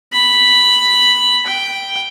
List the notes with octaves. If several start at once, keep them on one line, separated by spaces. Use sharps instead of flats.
B5
G5